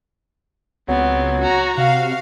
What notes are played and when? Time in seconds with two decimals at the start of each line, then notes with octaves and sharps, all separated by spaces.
0.88 C#2 F#3 B3 C4
1.41 F#4 A#5
1.78 C3 F#4 F5